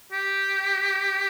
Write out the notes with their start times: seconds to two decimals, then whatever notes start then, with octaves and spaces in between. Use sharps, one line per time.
0.12 G4